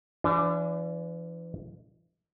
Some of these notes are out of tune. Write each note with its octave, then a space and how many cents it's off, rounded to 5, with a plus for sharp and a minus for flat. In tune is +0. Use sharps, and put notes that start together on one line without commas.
E3 +35 D4 -15